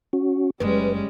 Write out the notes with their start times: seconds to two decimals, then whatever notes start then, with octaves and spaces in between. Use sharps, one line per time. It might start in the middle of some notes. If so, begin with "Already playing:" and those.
0.13 C#4 F#4
0.60 F#1 F#2 G3 G#3 C#4 B4